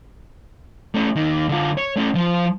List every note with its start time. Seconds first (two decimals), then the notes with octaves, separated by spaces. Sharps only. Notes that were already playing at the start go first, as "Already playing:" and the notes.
0.95 A3 C#4
1.16 D#2 D#3
1.49 D3 F4
1.78 C#5
1.97 A3 C#4
2.15 F3 C5